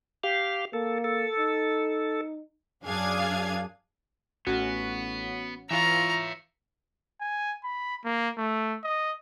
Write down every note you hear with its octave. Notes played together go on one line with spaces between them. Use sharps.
G4 F5
A#3 A4
A4
D#4
F#2 D4 G#4 F5 G#6
A1 B3 C#4 F#4
E3 F4 C#5 E5 A#5
G#5
B5
A#3
A3
D#5